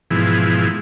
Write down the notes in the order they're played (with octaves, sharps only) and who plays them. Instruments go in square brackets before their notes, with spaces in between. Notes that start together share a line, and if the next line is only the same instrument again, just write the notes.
[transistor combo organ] G#2 B2 E3 F3 E4 G#4